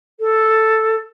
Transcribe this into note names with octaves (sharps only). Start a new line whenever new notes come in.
A4